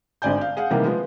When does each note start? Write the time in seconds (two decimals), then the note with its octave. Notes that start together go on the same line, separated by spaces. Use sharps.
0.22 G#1 G#2 D3 D5 G#5 G6
0.41 F5
0.57 G#4 F5 F#5
0.71 C3 D#3 E3 G3 A#3
0.85 F3 G#3 B3